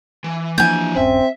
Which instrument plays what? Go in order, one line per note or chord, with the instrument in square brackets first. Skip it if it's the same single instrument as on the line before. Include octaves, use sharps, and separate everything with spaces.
[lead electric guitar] E3
[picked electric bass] E3 F3 A#3 [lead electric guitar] D4 E4 [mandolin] G#5 G6
[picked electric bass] D#1 G2 C#4 [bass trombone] C4 [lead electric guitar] E5